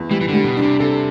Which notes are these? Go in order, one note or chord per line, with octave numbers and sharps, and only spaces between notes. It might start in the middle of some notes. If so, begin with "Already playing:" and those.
Already playing: E2
E3 G3
E3
D3
G3
B2
D4
C3
C3 A4